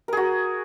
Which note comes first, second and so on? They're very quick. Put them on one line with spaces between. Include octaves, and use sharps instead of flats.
A#4 G#4 F#4